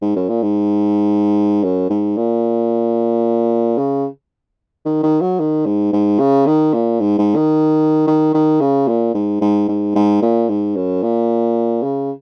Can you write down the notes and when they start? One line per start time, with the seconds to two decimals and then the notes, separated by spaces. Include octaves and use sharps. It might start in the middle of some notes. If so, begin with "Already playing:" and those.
0.02 G#2
0.16 F#2
0.29 A#2
0.42 G#2
1.63 F#2
1.90 G#2
2.17 A#2
3.78 C#3
4.85 D#3
5.03 D#3
5.21 F#3
5.39 D#3
5.66 G#2
5.92 G#2
6.19 C#3
6.46 D#3
6.73 A#2
7.00 G#2
7.18 G#2
7.35 D#3
8.07 D#3
8.34 D#3
8.61 C#3
8.88 A#2
9.14 G#2
9.41 G#2
9.68 G#2
9.95 G#2
10.22 A#2
10.49 G#2
10.76 F#2
11.03 A#2
11.83 C#3